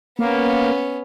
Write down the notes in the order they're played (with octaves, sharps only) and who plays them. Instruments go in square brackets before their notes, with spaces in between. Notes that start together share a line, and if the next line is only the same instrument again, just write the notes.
[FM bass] A#3 [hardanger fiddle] B3 C#4